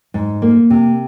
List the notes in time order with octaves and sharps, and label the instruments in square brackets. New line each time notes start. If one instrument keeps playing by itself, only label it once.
[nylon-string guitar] G#2
A#3
C3